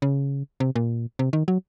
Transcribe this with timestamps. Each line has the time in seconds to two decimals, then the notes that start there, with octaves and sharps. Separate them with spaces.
0.02 C#3
0.60 C3
0.76 A#2
1.19 C3
1.33 D#3
1.48 F#3